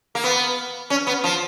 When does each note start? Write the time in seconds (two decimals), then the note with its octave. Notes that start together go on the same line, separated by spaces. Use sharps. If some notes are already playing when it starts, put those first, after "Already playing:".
0.15 A#3
0.24 B3
0.90 C#4
1.07 B3
1.24 F3